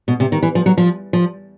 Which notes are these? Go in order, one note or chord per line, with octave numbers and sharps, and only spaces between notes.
B2
C3
D#3
E3
F3
F#3
F3
F3